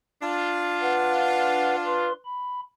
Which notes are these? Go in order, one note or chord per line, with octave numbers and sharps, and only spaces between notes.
D4 F4
B4 F5 F#5
B4 C6
B5